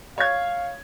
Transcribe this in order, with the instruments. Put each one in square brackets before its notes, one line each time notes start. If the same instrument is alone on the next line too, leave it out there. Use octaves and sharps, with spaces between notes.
[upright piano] C#5 G#6 [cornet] F5